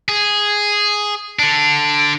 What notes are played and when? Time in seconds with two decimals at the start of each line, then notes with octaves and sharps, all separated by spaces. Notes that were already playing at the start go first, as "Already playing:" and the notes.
0.09 G#4
1.39 D3 D4